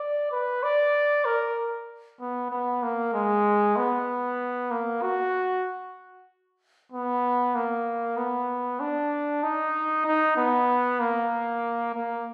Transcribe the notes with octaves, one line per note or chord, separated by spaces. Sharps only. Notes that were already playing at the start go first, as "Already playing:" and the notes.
Already playing: D5
B4
D5
A#4
B3
B3
A#3
G#3
B3
A#3
F#4
B3
A#3
B3
D4
D#4
D#4
B3
A#3
A#3